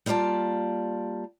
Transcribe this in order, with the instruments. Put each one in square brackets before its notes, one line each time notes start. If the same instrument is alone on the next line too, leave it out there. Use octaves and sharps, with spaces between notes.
[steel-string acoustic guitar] G3 A#3 F4 D5 A5